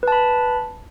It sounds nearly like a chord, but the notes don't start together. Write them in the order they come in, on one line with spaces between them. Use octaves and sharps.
B4 A5 B5